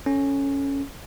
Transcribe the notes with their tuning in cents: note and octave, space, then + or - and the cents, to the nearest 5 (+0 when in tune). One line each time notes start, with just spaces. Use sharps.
C#4 +0 A4 +0